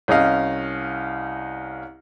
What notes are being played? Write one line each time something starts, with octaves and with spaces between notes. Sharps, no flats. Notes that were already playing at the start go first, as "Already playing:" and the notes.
C2 C#4 D#5 F5